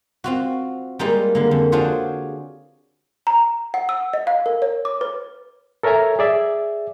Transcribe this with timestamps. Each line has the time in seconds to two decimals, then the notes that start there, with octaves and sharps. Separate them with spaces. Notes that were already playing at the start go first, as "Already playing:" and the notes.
0.24 C4 F4 F#4
0.99 G3 G#3 A#3 D#4 F4
1.35 D3 A#3
1.51 F2
1.72 D4 F4 F#4 G#4 C5 C#5
3.27 A#5
3.74 F#5
3.89 E6
4.13 D#5
4.27 F5
4.46 A#4
4.62 C#5
4.85 D6
5.01 B4
5.83 A4 A#4 C#5 E5 G#5 A#5
6.19 G#4 D5 E5